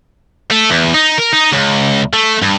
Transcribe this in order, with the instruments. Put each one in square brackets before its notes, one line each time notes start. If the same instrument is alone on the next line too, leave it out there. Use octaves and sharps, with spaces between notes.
[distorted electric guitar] A3
E2
D#4
A#4
D#4
C#2
A3
G2